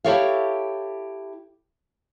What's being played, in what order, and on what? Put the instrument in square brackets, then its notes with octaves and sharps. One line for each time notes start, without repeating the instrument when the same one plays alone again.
[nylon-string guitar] E4 G4 A4 C#5 E5 F5